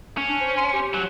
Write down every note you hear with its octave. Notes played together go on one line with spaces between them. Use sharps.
C#4
D4
C5
C6
G4
F#3 F#4